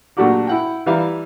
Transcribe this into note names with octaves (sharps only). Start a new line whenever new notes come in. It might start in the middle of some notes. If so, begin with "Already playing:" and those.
A#2 F#3 A3 D4 F#4 G4
E4 F#5 G5
E3 G3 E5 F5 A#5